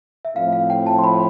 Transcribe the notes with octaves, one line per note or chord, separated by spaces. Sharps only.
E5
A2 F3 C4 F5
F5
G5
A5
C6
B5